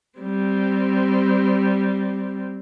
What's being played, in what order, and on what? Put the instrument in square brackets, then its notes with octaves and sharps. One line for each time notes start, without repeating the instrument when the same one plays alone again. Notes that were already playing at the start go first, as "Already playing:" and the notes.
[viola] G3 C4